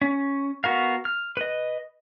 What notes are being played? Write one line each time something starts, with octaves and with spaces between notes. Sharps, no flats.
C#4
B3 F#4 A#4 F5
F6
B4 D#5